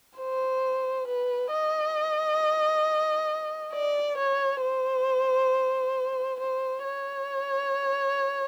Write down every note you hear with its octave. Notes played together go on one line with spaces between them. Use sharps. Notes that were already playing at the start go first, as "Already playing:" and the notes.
C5
B4
D#5
D5
C#5
C5
C5
C#5